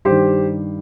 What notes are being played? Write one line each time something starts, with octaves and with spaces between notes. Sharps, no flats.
G2 G4 C5
D#3